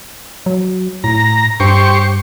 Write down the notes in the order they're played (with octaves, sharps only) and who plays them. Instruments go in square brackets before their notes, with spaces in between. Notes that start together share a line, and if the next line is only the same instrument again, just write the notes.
[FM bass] F#3
[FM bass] A2 [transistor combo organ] A#5
[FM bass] G2 [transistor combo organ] G4 C5 C#6